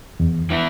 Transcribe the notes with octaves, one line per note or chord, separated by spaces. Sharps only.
E2
E3 B3 E4